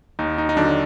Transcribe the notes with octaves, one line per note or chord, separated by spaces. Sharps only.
D#2 D#4
D#4
D#4
D3 F#3 D4